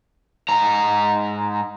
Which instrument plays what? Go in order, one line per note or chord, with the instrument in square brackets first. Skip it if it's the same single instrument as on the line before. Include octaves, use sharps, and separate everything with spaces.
[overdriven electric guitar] G#2 A#5